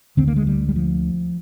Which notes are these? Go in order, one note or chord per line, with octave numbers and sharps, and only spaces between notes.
D2 D3 C4
A#3
G#3
G3
G3
F3